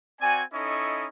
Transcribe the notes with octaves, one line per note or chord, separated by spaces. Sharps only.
C4 F#4 D5 G#5
C#4 D#4 E4 A4 D#5 C#6